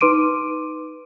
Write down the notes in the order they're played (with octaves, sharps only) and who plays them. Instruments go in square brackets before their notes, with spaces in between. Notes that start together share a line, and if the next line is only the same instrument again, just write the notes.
[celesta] D#4 B4 C6 D6 D7 D#7